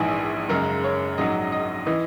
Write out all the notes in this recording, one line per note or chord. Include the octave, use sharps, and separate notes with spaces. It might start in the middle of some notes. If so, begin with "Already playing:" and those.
Already playing: A#1 G#2 E3 G#4
F#1 F#2 C#3 G#3 A#4
C#5
A#1 G#2 F#3 D#5
D#5
E3 D#5